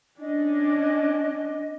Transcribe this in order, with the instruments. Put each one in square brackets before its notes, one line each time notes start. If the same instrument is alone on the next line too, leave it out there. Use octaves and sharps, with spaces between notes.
[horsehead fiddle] C#4 D4 [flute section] D#5